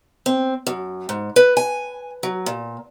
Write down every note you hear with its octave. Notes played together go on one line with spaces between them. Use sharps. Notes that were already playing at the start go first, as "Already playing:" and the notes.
C4
F#2
G#2
B4
G#5
F#3
A#2